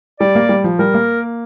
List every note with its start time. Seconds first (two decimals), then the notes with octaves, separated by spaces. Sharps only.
0.20 G3 D5
0.35 A#3
0.49 G3
0.64 F3
0.79 G3 A#4
0.94 A#3